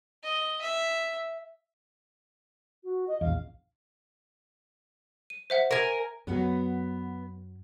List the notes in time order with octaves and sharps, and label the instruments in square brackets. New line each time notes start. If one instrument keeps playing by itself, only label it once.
[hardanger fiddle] D#5
E5
[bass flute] F#4
D#5
[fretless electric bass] A#1 E2 [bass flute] F5
[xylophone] D#7
C5 E5 F#5
[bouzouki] A#4 G#5
[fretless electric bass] F#2 F#3 [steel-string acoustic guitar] B3 B4 F#5